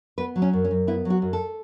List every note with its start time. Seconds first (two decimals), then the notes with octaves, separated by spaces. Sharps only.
0.18 B3 B4
0.36 F#3
0.42 C#4
0.53 F#2
0.65 C#4
0.71 F#2
0.87 B3 E4
1.05 F#3
1.10 F#4
1.22 F#2
1.33 A4